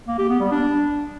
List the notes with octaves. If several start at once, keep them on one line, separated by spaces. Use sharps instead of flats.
A#3
G4
B3
G3
D4